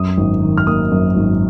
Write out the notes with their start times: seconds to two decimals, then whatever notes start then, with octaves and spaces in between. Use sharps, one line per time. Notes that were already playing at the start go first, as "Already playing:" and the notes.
Already playing: F#2 D#6
0.17 G#1
0.42 D#3
0.57 F6
0.66 A#3 D#6
0.92 F#2
1.16 G#1